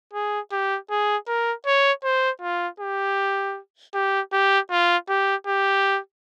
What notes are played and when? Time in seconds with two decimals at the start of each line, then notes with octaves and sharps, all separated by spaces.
0.13 G#4
0.52 G4
0.90 G#4
1.28 A#4
1.66 C#5
2.04 C5
2.42 F4
2.80 G4
3.94 G4
4.33 G4
4.71 F4
5.09 G4
5.47 G4